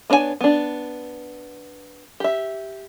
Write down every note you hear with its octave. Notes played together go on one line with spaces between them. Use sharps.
B3 D4 C#5 D5 G#5
B3 D4
G4 E5